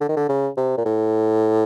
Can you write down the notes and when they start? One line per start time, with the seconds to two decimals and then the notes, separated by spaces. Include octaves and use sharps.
0.01 D3
0.09 D#3
0.17 D3
0.29 C#3
0.57 C3
0.77 A#2
0.85 A2